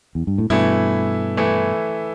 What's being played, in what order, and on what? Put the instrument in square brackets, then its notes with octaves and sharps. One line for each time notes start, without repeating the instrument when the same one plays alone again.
[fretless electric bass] E2
G2
A2
[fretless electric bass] G2 B2 [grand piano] E3 A3 E4
[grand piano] E3 A3 E4